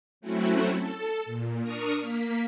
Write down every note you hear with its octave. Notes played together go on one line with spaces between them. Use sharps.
F#3 A3 C4 C#4 E4 F#4
A4
A#2
D4 A#4 C#6 D#6 F6
A#3 B6